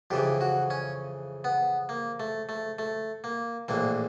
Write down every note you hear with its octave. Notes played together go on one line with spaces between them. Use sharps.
F2 C#3 E3 G4
F#4
C#4
B3
A#3
A3
A3
A3
A#3
A#1 A2 E3 A#3